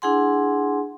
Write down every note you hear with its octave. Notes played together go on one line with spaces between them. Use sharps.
D4 E4 G#4 F#5 G#5 C6